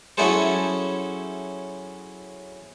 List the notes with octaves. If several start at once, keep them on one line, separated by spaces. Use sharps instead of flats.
F#3 C#4 E4 G#4 A4 C5